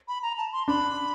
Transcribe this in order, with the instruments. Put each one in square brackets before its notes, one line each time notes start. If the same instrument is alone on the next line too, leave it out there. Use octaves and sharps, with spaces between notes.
[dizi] B5
A#5
A5
C6
[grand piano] D4 [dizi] B5